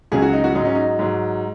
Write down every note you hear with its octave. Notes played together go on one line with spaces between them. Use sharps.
C#2 C#3 F#3 G#4
F#4
D#4
F#4
G#2 F#3 D#4
C#4
D#4
G#2 F#3